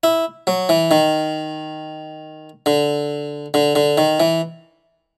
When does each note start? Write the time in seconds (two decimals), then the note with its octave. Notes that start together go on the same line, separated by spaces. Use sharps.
0.03 E4
0.47 F#3
0.69 E3
0.91 D#3
2.66 D3
3.54 D3
3.75 D3
3.98 D#3
4.20 E3